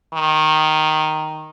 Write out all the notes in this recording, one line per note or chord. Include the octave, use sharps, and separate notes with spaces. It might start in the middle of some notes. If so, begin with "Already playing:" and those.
D#3